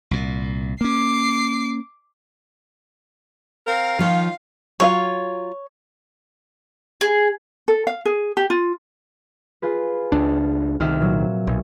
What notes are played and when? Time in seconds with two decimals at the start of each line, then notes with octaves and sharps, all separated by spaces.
0.11 C2 A#2
0.81 A#3 C#4 D6 C7
3.66 C4 A#4 F5
3.99 D#3 F3 F4 C#5
4.80 F#3 F4 C#5 F5
7.01 G#4
7.68 A4
7.87 F5
8.05 G#4
8.37 G4
8.50 F4
9.62 F4 G#4 B4
10.12 C#2 D4
10.80 C2 C3 D#3 E5 F6
11.00 A#2 F#3
11.47 B1